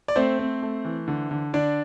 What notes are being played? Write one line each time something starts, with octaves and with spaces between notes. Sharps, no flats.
D5
A3 C4 C5
C4
A3
E3
D3
D3
D3 D4 D5